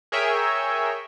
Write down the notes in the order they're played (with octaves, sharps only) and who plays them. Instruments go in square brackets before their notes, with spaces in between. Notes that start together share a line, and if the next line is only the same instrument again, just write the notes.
[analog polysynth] G#4 A#4 C#5 E5 G5 G#5